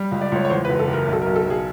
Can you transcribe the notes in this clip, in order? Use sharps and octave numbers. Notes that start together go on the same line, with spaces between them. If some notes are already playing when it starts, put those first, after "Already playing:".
Already playing: G3
C#2
D5
C#2 C#5
C#5
E2 C5
B4
F#1
A4
F#1
A#4
B1 A4
A#4
B1
A4
B1 G#4